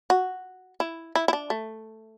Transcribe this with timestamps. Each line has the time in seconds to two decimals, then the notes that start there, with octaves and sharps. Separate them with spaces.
0.10 F#4
0.80 E4
1.15 E4
1.28 E4
1.33 D4
1.50 A3